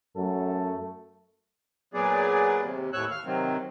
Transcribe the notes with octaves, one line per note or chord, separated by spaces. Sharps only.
F#2 F#3 A3 A4
A#2 F#3 B3 G#4 D5
D#2 C3
D#2 A2 C#5 E6 F#6
F5 F6
C3 D#3 F#3 C4